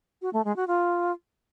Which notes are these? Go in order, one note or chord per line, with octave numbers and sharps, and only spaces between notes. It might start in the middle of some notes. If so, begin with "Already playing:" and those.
F#4
A3
G#3
F#4
F4